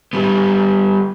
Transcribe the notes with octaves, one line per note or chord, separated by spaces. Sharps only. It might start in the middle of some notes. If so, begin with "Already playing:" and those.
G3 B3